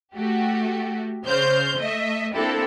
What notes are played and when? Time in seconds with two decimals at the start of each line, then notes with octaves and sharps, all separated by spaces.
0.16 A3 F#4 G4
1.24 C#3 C5 F6 G6
1.77 A3 D#5 E5
2.34 A#3 C4 D4 E4 G4 A4